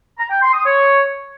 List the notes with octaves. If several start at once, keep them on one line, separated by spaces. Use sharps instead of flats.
A#5
G5
C6
D#6
C#5